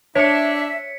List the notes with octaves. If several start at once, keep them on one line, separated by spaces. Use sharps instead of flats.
D4 C#5 E5 B6 C#7